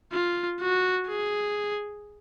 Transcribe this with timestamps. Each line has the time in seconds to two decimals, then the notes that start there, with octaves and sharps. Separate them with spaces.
0.12 F4
0.61 F#4
1.07 G#4